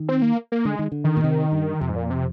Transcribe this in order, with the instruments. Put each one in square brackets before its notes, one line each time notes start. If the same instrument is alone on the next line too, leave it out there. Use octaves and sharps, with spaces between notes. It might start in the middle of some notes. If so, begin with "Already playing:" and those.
Already playing: [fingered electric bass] D#3
[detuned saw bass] C4
A#3
A#3
[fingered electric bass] D3 [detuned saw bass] G#3
[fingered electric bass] D#3
D3
[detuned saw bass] D#3
[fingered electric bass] A#2
C3
G2
[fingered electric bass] F2 [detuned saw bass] C3
[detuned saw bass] G#2
A#2
C3